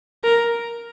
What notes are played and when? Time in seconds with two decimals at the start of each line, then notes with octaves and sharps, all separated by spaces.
0.24 A#4